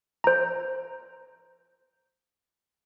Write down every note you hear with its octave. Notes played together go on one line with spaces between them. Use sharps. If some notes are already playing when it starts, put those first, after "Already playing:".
C5 A#5